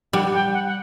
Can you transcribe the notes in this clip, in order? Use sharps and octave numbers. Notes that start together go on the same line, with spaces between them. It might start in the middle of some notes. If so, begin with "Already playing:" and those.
G3 F#5
G5
F#5
F#5